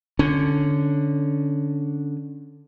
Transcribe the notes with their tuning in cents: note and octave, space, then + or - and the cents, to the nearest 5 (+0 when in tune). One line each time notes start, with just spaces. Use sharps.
D3 +0 C#4 +0